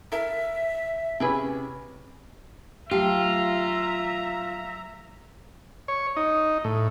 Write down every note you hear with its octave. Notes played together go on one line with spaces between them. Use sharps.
E4 A4 A#4 E5
C3 C#4 E4 G#4 B4
F#3 A3 F4 G4 E5 A#5
C#5
D#4
A2